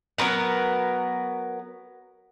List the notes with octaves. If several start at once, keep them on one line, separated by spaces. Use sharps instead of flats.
F#3 B3 A#4 B4